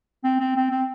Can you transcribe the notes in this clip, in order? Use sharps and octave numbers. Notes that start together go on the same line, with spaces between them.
C4
C4
C4
C4